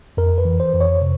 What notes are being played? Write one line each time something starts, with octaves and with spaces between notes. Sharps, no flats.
F2 A#4
B4
E3
C5
F2
C#5
C3